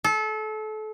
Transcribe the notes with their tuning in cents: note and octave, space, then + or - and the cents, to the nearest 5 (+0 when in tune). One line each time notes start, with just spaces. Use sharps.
A4 -30